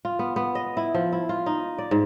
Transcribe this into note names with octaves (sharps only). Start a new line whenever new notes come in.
F4
B3
B3
D#5
E4
F3
E4
F4
D#4
D5
G#2